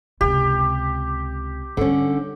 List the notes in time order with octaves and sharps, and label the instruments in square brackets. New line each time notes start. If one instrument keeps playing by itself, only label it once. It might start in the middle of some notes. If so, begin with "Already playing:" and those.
[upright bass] C#2 C3 [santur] G4
[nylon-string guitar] D3 C#4 [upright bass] G3 B3